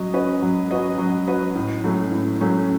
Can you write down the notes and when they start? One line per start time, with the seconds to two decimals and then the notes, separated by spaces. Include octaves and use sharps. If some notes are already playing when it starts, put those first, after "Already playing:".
Already playing: F#3 C#4 F#4 D#5
0.14 C#4 F#4 B4 D#5
0.42 F#3
0.71 C#4 F#4 B4 D#5
0.98 F#3
1.27 C#4 F#4 B4 D#5
1.55 A2
1.84 F#3 A3 C#4
2.12 A2
2.41 F#3 A3 C#4